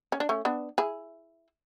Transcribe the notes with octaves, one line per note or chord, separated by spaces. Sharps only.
C#4
D4
A3 C#4
B3 D4
E4 G#4